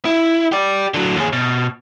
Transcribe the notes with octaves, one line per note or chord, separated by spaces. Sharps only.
E4
G4 D5
D3 F#3
D#2 G#4
B2